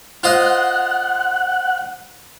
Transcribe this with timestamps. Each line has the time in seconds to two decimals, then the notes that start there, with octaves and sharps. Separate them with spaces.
0.23 F4 C5 D#5 F#5